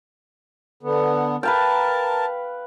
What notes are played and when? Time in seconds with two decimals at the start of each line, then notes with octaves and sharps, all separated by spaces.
0.83 D3 B3
1.43 A#4 B4 F5 G5 A5